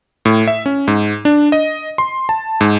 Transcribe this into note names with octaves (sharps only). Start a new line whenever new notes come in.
A2
E5
C#4
G#2
D4
D#5
C6
A5
G#2